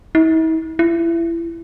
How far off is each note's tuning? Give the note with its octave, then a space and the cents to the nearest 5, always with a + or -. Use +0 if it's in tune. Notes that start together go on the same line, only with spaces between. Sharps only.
E4 -45
E4 +25